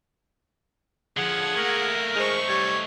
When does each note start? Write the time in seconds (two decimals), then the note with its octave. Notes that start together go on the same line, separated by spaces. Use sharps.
1.17 D3 F3 G#4 F#5 G#6
1.57 A3 A#3 A#4
2.16 G#3 A3 D#4 C5 C#6
2.48 G3 C#5